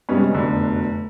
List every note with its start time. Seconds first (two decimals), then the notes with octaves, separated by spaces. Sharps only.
0.09 G2 C3 G3 G#3 B3 C#4
0.31 F1 F#2 B2 D3